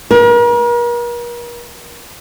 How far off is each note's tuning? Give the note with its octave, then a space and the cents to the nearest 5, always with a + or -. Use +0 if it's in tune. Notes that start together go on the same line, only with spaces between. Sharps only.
A#4 +40